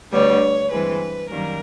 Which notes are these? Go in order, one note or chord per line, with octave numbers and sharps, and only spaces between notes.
D2 D3 G3 B3 C#5
G2 E3 G#3 C4 B4
F#2 D#3 G3 A#3 A#4